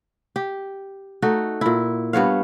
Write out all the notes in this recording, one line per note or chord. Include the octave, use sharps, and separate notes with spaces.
G4
A3 D#4 F#4
A#2 E4
G2 B3 C#5 F5